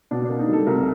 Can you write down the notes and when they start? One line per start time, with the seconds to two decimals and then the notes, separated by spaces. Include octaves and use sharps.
0.11 B2 D4
0.25 A#3 D4
0.39 D#4
0.48 G3 A4
0.67 C2 A#4